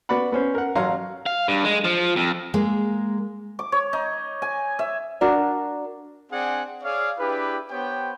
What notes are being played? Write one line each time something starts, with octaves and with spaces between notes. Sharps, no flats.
B3 F#4 D5 F#5 B5
B3 C#4 C5
A#4 F#5
A1 F#3 C#5 F5 A#5 C6
F5
G2
G#3
F3
F2
G#3 A#3
D6
C#5
D#4
G#5
E5
D4 F#4 A#4 D5
C4 D4 G#4 D5 F#5 G#5
G#4 C#5 D5 F5
D4 E4 G4 G#4 B4
B3 G4 C5 C#5 G5